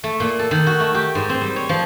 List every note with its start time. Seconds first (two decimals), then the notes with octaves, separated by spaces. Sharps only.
0.04 A3
0.20 A#2
0.39 A4
0.51 D#3
0.67 F#4
0.80 A3
0.95 G4
1.15 G#2
1.29 C4
1.41 G3
1.56 C#5
1.69 F3